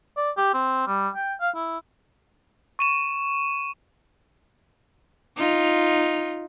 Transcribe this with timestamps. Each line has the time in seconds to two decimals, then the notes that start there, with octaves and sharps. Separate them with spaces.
0.17 D5
0.37 G4
0.54 C4
0.87 G3
1.15 G5
1.40 F5
1.55 E4
2.79 C#6 D#7 E7
5.37 D#4 F4